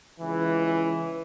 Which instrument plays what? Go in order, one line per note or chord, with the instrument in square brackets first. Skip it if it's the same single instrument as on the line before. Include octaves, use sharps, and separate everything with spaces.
[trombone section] C#2 E3